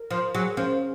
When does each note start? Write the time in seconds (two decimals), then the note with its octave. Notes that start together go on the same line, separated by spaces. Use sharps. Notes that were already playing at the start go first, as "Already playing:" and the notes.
Already playing: A#4
0.11 F3
0.35 F#3 G#4
0.57 F3 C#4